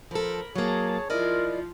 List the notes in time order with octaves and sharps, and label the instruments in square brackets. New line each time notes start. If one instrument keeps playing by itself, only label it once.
[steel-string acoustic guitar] F3 A4 [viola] A#4 B5
[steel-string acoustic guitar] F#3 A#3 [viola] G#4 A5 [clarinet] C#5
[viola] F3 F4 [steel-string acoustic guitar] E4 D5 D#5 [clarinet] A#4